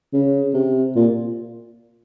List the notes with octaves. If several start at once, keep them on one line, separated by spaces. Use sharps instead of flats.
C#3
C3
A#2